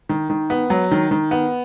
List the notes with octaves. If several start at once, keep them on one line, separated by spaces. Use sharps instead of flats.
D#3
D#3
B3
F#3
D#3
D#3
B3